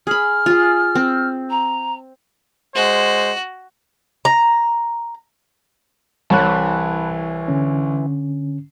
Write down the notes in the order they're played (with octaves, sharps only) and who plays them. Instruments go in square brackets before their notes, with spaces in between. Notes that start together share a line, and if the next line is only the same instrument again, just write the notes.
[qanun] G#4 B5 [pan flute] F6
[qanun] F4 G#4
C4
[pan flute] A#5
[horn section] G#3 C5 [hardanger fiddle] F#4
[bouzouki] A#5
[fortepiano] C2 C#5 [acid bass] E3 [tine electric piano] A5 B5 F#6
[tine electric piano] D3 C#4